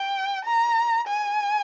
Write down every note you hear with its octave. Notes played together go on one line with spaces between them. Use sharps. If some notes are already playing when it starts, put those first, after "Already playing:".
Already playing: G5
A#5
G#5